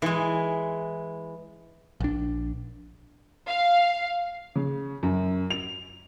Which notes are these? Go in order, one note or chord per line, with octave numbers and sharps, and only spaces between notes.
E3 G#3
A#1 D4
F5
C#3
F#2
F7